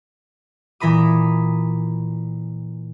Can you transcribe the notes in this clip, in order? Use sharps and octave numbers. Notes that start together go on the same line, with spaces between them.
A#2 E3 A#5 B5 D#6